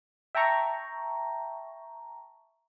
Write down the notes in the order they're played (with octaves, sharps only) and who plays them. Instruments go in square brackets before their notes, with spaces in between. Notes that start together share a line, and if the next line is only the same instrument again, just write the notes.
[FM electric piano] E5 G5 A5 A#5 C#6